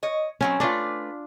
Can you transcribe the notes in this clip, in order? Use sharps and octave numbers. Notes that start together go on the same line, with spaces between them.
C#5 D#5
B2 F#3 C4 C#4
A3 D4 F4 B4 D5